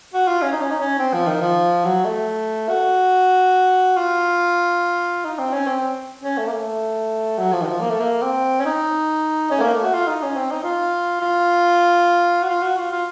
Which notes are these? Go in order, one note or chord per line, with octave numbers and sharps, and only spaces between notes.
F#4
F4
C#4
D#4
C#4
D#4
C#4
C4
F3
D#3
F3
F#3
A3
F#4
F4
D#4
C4
C#4
C4
C#4
A3
A#3
A3
F#3
F3
D#3
F3
A#3
A3
A#3
C4
C#4
D#4
C#4
A3
A#3
A3
F#4
F4
D#4
C#4
C4
D#4
F4
F4
F#4
F4
F#4
F4
F4